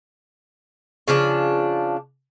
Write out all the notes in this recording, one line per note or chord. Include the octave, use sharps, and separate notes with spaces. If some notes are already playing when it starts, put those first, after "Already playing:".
C#3 F3 D4